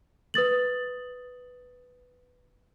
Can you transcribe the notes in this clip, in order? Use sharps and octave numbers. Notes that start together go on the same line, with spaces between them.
B4 D#6 A6 F#7